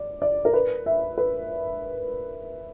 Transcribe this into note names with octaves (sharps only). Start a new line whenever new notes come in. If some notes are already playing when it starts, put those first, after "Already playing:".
Already playing: D5
D5
A#4
B4
E5
B4